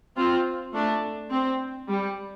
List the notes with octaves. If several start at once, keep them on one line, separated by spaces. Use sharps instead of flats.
C4 F4
A3 D4
C4
G3